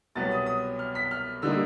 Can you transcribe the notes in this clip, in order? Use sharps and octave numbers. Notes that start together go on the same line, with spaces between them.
C2 B2 F#3 B3 A6
D#6
D#6
F6
B6
F6
D3 G3 A#3 D#4 E6